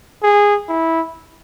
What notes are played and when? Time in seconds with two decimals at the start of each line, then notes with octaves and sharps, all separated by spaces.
0.23 G#4
0.69 E4